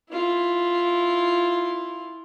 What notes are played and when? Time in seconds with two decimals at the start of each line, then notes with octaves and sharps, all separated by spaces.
0.10 E4 F4